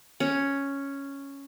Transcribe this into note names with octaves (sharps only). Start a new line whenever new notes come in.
C#4